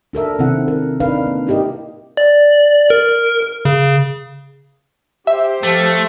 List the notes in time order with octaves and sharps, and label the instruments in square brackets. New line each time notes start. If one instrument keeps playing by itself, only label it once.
[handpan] D4 A4 A#4 E5
C3 D#3 C4 E4 F#5
A#4
D4 D#4 A#4 B4 F5
A#3
D#4 E4 G4 A#4 D#5
[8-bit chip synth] D5
A#4
C#3
[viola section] G4 C5 [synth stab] E5
[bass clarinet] F3 [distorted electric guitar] A3